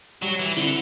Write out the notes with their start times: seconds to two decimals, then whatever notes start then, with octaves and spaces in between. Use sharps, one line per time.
0.22 F#3 G3
0.39 E3
0.56 D3 C4 E4